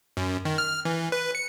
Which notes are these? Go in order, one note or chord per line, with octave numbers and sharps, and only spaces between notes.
F#2
D#3
F6
E3
B4
C#7